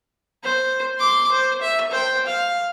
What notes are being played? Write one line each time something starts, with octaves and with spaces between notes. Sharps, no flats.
C5
C6 D6
C5
E5
C5 G5
F5